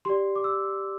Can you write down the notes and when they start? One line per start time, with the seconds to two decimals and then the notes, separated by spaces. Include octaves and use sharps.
0.05 G4 D5 C6
0.35 D6
0.44 E6